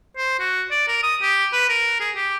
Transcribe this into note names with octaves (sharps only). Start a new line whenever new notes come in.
C5
F#4
D5
A#4
D#6
G4
B4
A#4
G#4
G4